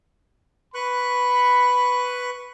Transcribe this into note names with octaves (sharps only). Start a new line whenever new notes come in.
B4 B5 C#6 F#6